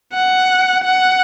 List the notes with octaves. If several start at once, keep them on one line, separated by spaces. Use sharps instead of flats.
F#5
F#5